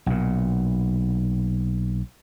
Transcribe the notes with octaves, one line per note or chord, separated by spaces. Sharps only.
B1 A#2